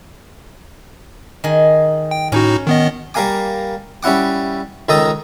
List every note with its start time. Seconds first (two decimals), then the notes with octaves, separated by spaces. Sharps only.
1.44 D#3 G#4
2.11 G5
2.32 A2 C#4 D#4 F#4
2.67 D#3 B3 D#5
3.14 G3 A#3 A#4 F5 G#5 D6
4.03 G3 C#4 E4 F#5 D6
4.89 C#2 D#3 D#4 A4 A#5 D#6